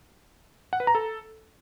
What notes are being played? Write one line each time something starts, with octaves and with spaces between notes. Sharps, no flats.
F#5
B4
A#5
A4